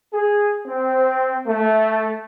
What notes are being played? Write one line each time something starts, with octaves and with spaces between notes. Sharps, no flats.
G#4
C4
A3